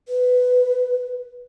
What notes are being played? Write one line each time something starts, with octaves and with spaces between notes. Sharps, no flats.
B4